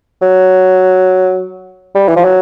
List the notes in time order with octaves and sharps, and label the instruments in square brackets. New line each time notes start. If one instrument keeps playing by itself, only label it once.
[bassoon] F#3
G3
E3
F3
F#3